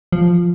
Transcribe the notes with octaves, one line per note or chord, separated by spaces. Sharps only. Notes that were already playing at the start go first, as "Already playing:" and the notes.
F3